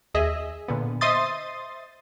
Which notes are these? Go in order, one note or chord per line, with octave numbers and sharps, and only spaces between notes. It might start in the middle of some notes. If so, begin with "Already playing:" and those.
D#2 G#4 D#5 E5
A#2 D3 B3
C5 D#5 E5 C6 D#6 A6